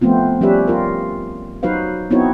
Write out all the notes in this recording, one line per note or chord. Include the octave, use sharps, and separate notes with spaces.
F3 A3 B3 C4 F4
F3 G3 C#4 G4 B4 E5
F4 A#4
F#3 D#4 F#4 B4 C5 F5
B3 C4 D#4 E4 F#4 C#5